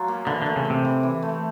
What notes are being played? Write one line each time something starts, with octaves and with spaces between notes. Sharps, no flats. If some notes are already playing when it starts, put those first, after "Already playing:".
Already playing: F#3 C#4 F4
A#3
D3 E3
D3
A3
C#3
C4
C3
E3
E3
A3